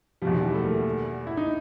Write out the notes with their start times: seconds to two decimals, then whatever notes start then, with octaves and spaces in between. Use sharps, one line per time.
0.22 F3 G3
0.25 E2 B2
0.32 D#3
0.43 E3
0.54 A3
0.64 A#3
0.75 A3
1.27 E4
1.37 D#4